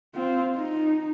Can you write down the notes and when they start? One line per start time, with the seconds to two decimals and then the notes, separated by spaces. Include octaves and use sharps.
0.15 C4 F4
0.56 D#4